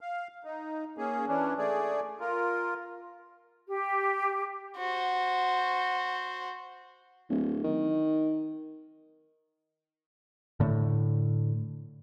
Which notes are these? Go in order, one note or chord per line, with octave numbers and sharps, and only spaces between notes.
F5
D#4
A#3 C#4 G#4
E3 C#4 D4
A3 G#4 D5
F4 A#4
G4
F#4 C5
D1
D#3
A2 D3